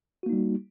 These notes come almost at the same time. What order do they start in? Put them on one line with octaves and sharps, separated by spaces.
F#4 A#3 D#4 G3